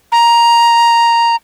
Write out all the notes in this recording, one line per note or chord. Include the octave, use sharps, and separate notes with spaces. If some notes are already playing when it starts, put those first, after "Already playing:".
A#5